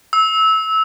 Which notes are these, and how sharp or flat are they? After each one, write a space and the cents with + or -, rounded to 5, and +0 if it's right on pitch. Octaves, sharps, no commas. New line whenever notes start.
E6 -20